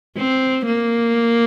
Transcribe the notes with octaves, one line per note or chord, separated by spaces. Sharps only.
C4
A#3